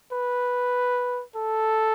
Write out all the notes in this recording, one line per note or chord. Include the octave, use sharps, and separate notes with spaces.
B4
A4